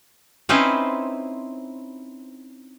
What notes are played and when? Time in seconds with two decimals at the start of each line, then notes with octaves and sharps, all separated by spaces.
0.49 C4 C#4 D#4 E4 B4 C5